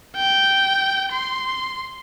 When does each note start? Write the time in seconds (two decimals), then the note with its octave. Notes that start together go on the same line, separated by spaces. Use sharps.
0.16 G5
1.12 C6